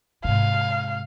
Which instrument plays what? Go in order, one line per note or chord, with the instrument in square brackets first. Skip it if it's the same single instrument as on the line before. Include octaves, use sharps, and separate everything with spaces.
[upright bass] G#2 C3 [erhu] F5